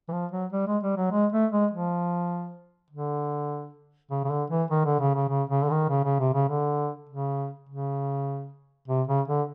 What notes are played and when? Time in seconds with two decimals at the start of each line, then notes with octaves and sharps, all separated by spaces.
0.08 E3
0.12 F3
0.32 F#3
0.52 G3
0.67 G#3
0.83 G3
0.97 F#3
1.12 G#3
1.33 A3
1.52 G#3
1.71 F3
2.91 D3
4.11 C#3
4.24 C#3
4.30 D3
4.50 E3
4.71 D#3
4.85 D3
4.99 C#3
5.14 C#3
5.29 C#3
5.50 C#3
5.63 D3
5.70 D#3
5.89 C#3
6.04 C#3
6.20 C3
6.34 C#3
6.49 D3
7.09 C#3
7.69 C#3
8.88 C3
9.08 C#3
9.28 D3